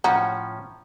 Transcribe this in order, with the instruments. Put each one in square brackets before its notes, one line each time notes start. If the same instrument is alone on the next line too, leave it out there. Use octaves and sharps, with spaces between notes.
[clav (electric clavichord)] A2 F3 C#4 [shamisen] F#4 [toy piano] A#5